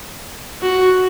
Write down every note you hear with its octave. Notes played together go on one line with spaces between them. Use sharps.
F#4